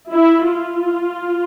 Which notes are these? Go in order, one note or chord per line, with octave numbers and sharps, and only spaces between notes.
E4
F4